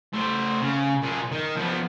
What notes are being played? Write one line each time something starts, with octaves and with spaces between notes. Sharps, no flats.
A3 C5
C#3
A#2 G#4
D#3
F3 B3